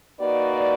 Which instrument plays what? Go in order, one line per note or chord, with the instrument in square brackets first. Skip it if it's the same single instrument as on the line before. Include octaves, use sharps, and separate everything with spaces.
[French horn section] A#3 D#4 F#4 B4 D5